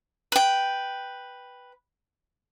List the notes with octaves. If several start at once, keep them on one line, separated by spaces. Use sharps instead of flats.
B4 G5